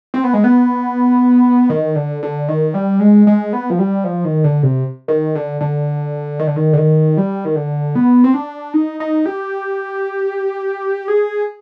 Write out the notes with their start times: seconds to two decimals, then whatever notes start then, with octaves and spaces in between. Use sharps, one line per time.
0.14 C4
0.24 B3
0.33 G#3
0.44 B3
1.69 D#3
1.96 D3
2.23 D3
2.48 D#3
2.74 G3
3.00 G#3
3.27 G#3
3.53 B3
3.70 F3
3.79 G3
4.04 F3
4.24 D#3
4.44 D3
4.63 C3
5.08 D#3
5.35 D3
5.61 D3
6.39 D#3
6.47 D3
6.56 D#3
6.73 D3
6.77 D#3
7.17 G3
7.45 D#3
7.56 D3
7.95 B3
8.24 C4
8.34 D4
8.74 D#4
9.00 D#4
9.26 G4
11.08 G#4